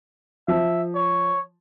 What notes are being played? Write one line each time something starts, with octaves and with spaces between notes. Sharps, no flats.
F3 E5
C#5